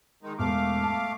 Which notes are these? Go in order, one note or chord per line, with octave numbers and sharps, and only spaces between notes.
D#3 G#3 D#4
E1 A3 F5 D6
A5